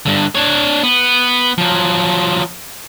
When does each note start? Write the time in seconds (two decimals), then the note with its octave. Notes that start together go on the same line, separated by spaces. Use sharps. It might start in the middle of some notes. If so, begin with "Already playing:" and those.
0.06 G2 D3
0.35 D4 C#5
0.83 B3
1.58 F3 F#3